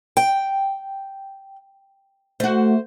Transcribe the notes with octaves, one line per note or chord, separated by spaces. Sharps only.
G5
A3 F#4 C5